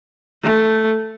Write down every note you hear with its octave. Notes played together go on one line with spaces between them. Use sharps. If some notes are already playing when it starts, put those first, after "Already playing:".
A3